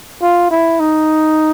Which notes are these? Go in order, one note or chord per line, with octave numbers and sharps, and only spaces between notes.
F4
E4
D#4